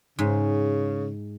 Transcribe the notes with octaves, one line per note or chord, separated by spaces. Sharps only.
G#2 C#3